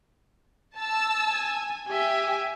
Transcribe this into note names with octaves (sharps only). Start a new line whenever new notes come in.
A5 E6
G#5
G4 E5 G#5